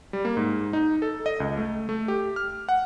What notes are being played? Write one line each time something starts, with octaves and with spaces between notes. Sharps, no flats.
G3
A#3
G#2
D#4
A4
D#5
C#2
A3
A3
G4
F6
F#5